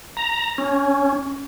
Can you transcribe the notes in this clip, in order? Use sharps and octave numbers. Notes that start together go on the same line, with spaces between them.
A#5
C#4